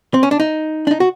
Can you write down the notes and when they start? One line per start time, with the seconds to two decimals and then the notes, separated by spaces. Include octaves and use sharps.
0.14 C4
0.23 C#4
0.31 D4
0.40 D#4
0.87 D4
0.91 D#4
1.00 F#4